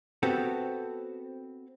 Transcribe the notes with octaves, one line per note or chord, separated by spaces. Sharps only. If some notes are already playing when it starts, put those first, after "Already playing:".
B3 C4 F#4 G4 A4